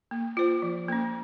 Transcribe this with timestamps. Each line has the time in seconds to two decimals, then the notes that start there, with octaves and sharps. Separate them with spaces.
0.11 A#3
0.37 F4 C5
0.62 F3
0.88 A#3 C#4